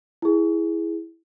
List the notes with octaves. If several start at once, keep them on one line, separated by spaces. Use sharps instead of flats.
E4 G#4